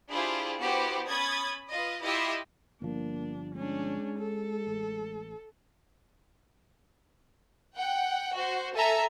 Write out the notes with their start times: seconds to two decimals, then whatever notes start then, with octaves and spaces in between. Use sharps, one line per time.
0.10 D4 E4 F4 G4 G#4 C5
0.61 B3 E4 F#4 G4 C5
1.08 C#4 B5 D#6 G#6 A6
1.70 F4 B4 D#5
2.02 E4 F4 G4 D#5 E5 C6
2.82 G1 F3 A#3 D4
3.55 G#3 C#4 D4
4.18 A4
4.67 A1
7.76 F#5 G5
8.36 F#4 C5
8.77 A4 E5 G#5 A#5